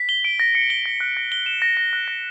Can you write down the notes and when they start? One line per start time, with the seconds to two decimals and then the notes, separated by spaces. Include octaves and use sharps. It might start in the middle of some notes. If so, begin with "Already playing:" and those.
Already playing: B6
0.09 G7
0.25 D7
0.40 A#6
0.55 C#7
0.70 G7
0.86 A#6
1.00 F#6
1.17 A#6
1.32 G7
1.46 E7
1.62 A#6
1.77 A#6
1.93 F#6
2.08 A#6